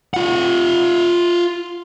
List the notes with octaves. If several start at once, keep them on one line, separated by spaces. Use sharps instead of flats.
F4 F#5